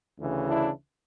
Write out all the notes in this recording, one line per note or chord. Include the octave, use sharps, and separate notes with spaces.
D2 C#3 E3
D4 E4